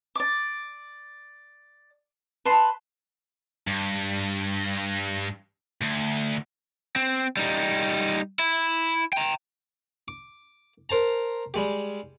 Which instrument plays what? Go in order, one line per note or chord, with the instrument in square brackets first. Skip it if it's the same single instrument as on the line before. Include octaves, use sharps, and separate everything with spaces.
[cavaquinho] D5 D6
B4 A5 C6
[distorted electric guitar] G2
D2
[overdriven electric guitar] C4
G3 D#4
E4
G5 A#5
[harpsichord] D6
A#4 C5 A5 A#5
G3 G#3 G4